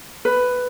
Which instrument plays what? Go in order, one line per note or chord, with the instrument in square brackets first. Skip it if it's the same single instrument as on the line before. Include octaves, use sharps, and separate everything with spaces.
[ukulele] B4